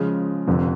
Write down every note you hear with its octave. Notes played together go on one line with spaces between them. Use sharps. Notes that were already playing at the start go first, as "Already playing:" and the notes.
Already playing: C#3 F3 G#3
F1 F2 D3 F3